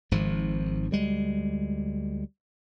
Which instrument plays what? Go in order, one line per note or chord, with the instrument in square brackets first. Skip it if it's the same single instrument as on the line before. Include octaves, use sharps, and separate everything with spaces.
[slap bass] G#1 G#2 F3
D2 G3 G#3